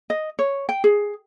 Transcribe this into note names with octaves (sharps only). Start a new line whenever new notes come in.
D#5
C#5
G5
G#4